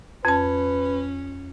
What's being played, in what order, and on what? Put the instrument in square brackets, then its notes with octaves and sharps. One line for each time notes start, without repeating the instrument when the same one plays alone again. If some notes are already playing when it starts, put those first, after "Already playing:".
[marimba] F2 A5 [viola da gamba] C#4 [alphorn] B4